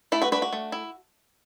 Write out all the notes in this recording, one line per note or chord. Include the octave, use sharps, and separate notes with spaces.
A3 E4 A4
F#4 B4
D4 F#4 B4
F#4
A3
E4